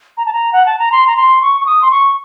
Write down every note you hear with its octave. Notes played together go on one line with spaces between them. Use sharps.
A#5
A5
A#5
F#5
A5
A#5
C6
A#5
C6
C#6
C#6
D#6
C6
C#6